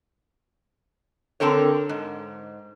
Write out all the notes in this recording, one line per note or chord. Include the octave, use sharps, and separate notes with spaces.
D3 C4 A4 A#4 C#5
G#2